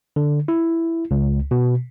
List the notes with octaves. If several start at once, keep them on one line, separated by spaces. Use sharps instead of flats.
D3
E4
C#2
B2